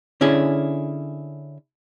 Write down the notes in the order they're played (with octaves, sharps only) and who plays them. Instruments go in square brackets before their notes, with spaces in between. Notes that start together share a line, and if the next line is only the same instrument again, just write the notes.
[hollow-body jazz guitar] D3 C#4 E4 G#4